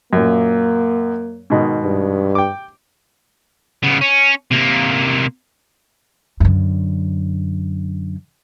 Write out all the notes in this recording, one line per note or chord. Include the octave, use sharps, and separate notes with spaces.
F#2 A#2 A#3
G#2 B2 D#3
G2
G5 D6
C#3 B3
C#4
C3 A#3
F#2 D3